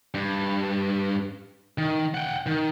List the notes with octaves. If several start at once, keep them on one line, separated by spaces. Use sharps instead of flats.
G2
D#3
F#5 G5
D#3